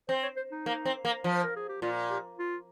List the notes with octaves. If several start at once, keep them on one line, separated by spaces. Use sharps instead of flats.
C4 C5
C#5
C5
D#4
A#3
C4
A#3
F3
C5
A#4
G#4
G4
A#2 F4
G4
F4